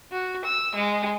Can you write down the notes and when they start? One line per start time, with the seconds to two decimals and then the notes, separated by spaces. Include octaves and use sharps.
0.12 F#4
0.45 E6
0.75 G#3